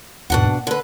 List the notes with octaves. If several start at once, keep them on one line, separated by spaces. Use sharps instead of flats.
D#2 G#2 B2 D4 F#5
A#3
D3 B4